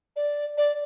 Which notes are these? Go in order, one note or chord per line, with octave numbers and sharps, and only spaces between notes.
D5
D5